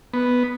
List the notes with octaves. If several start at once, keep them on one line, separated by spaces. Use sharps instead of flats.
B3